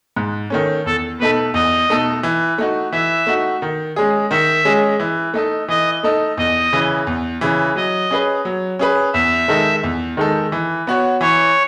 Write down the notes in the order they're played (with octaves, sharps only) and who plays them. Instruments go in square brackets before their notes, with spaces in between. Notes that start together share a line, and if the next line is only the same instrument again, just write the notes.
[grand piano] G#2
D#3 A3 C#4
[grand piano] E2 [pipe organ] A4
[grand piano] B2 A3 D#4 A4 [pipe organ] B4
[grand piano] E2 [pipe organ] D#5
[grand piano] B2 A3 D#4 A4
E3
A3 D#4 F#4
[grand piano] E3 [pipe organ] E5
[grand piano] A3 D#4 F#4
D#3
G#3 C#4 G#4
[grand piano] D#3 [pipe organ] E5
[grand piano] G#3 C#4 G#4
E3
A3 D#4 A4 D#5
[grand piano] E3 [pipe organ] D#5
[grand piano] A3 D#4 A4 D#5
[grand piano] E2 [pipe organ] D#5
[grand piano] C#3 E3
E2
C#3 E3
[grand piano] F#3 [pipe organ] D#5
[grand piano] C#4 G#4 B4
F#3
C#4 G#4 B4
[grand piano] E2 [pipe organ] E5
[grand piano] D#3 G#3 D#4 A4
E2
D#3 G#3 D#4 A4
E3
B3 F#4 C#5
[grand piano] E3 [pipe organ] C#5